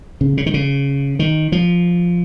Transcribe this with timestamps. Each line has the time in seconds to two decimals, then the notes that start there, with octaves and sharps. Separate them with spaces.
0.21 C#3
0.37 C#3
0.46 D#3
0.54 C#3
1.19 D#3
1.52 F3